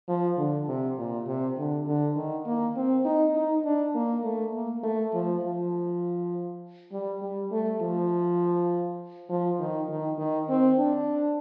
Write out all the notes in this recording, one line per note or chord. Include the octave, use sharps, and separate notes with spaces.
F3
D3
C3
A#2
C3
D3
D3
D#3
A#3
C4
D#4
D#4
D4
A#3
A3
A#3
A3
F3
F3
G3
G3
A3
F3
F3
D#3
D#3
D#3
C4
D4